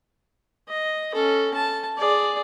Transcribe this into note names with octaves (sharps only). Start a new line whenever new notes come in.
D#5
C#4 A4
A5
G#4 D5